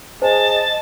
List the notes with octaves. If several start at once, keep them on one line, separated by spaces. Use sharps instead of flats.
G#4 C5 D#5 A5